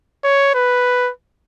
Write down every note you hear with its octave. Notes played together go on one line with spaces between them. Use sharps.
C#5
B4